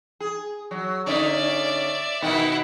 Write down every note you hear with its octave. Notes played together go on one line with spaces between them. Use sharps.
G#4
F#3
D3 C#4 D#4 D5 E5
B2 D#3 E4 F#5